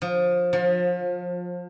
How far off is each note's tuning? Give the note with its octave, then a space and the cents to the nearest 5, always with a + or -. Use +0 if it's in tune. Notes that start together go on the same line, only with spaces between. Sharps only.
F3 +20
F3 +35